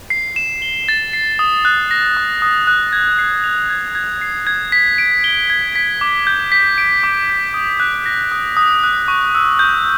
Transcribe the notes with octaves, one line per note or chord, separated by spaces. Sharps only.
C7
E7
G7
A6
C7
D#6
F#6
A#6
D#6
D#6
F#6
G#6
C7
F7
G#6
G#6
C7
G#6
B6
D7
G7
G#6
B6
D6
G6
B6
D7
D6
G6
D#6
F#6
A#6
D#6
D#6
F#6
C#6
E6
G6